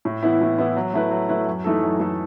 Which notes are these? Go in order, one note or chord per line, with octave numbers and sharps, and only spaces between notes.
A2
E3 B3 E4
A2
E3 B3 E4
F#3
A3 E4 B4
F#3
A3 E4 B4
F#2
E3 A3 D#4 A4
F#2
E3 A3 D#4 A4